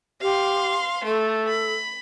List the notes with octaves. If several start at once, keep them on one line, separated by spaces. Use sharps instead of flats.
G4 F5 C6
A3 A4
B5